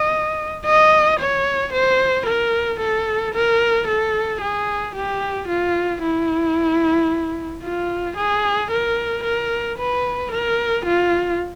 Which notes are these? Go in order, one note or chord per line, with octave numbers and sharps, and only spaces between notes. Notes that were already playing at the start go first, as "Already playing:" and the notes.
Already playing: D#5
D#5
C#5
C5
A#4
A4
A#4
A4
G#4
G4
F4
E4
F4
G#4
A#4
A#4
B4
A#4
F4